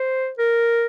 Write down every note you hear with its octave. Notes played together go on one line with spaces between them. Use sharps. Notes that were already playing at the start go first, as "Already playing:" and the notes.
Already playing: C5
A#4